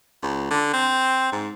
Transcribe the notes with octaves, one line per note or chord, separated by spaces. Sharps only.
C#2
D3
C4
G#2